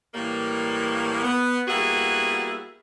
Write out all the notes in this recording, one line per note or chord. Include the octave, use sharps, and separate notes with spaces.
A2 E3 G3 A#3
B3
G3 A#3 B3 E4 F#4 G#4